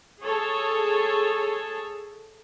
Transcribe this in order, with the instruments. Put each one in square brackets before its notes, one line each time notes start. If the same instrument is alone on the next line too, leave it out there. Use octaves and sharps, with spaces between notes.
[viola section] G#4 A4 C#5